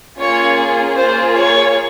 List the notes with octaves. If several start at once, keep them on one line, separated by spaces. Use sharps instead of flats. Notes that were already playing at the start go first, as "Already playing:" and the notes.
A#3 C#4 F4 G#4 C#5
A#3 F4 G#4 C5
C#5